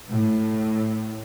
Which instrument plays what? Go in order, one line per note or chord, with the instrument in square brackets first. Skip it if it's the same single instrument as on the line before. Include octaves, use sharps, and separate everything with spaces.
[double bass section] A2